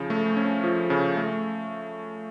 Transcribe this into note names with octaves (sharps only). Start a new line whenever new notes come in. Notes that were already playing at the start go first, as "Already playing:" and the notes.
Already playing: C#3 F3
A3
C#4
F3
C#3
A3